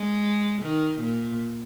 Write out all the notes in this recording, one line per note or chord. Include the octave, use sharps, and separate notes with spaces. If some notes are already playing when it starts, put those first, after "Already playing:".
Already playing: G#3
D#3
A#2